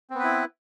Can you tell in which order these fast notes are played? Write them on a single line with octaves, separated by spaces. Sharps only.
C4 B3 B4 E4